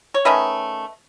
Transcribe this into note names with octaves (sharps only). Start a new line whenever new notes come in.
C#5
D#3 A3 C#4 B4 D#5